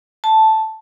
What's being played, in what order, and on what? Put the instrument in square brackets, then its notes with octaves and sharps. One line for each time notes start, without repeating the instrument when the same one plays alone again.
[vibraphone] A5